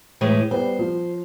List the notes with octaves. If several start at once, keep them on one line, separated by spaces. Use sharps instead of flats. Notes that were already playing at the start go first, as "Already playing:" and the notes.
A2 E3 G#3
G3 B3 G4 C5
F3